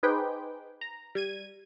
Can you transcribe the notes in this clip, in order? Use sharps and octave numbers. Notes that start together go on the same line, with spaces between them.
D#4 G#4 B4 C5 G5 D6
A#5
G3 G#6 D#7